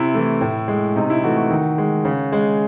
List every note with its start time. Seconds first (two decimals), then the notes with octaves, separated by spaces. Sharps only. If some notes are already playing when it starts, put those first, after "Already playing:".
Already playing: C3 E4
0.14 E3 A3
0.41 A2
0.68 G#3
0.96 C3 D#4
1.10 E4
1.23 E3 A3 F#4
1.37 F#4
1.51 D#3
1.78 G#3
2.05 C#3
2.32 G#3